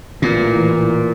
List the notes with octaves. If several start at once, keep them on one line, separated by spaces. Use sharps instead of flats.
A1 A#2 E3